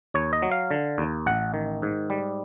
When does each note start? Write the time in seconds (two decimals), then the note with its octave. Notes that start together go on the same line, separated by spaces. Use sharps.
0.14 D#2 C#5
0.33 D#5
0.42 F#3
0.52 F5
0.71 D3
0.98 D#2
1.26 A1 F#5
1.54 D#3
1.82 G#2
2.10 G3